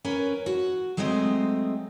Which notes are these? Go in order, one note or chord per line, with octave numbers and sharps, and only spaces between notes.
C#4 A#4 B4
F#4
F#3 G#3 A3 C4 D#5